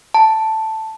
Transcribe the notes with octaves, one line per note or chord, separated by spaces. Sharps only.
A5